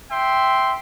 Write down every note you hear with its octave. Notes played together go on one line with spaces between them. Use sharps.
E5 G5 C6